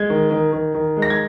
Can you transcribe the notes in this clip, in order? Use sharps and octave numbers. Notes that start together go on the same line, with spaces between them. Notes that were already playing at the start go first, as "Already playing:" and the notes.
Already playing: G#3 G#6
D#3
D#3
D#3
D#3
G#3
A#6
G#6